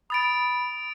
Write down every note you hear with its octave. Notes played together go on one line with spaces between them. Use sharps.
B5 D#6 A6 D7